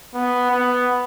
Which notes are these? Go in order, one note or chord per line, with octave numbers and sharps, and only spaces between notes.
B3
B3